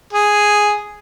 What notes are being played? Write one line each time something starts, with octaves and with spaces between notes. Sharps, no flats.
G#4